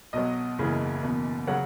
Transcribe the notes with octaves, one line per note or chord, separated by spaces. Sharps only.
B1 B2 F#3 D#5
F#1 E2 C#3 E3
F#1 E2 B2
C#3 F#3 F#5